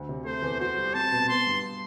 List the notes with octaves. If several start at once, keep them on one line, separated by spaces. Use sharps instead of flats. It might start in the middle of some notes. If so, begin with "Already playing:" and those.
Already playing: D2
C3
A3 C5
E2
F#4 C5
G3
C4 A5
B2
B3 C6
G2